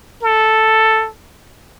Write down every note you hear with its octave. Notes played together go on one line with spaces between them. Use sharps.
A4